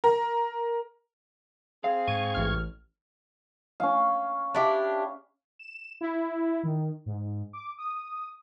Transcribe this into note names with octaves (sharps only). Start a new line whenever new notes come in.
A#4
C4 G#4 F5
G#2 C#6 G#6 D#7
A1 F6
C#4 F5
D4 E4 G4
E7
E4
D#3
G#2
D6
D#6